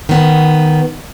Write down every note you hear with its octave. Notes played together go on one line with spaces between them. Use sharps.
D#3 B3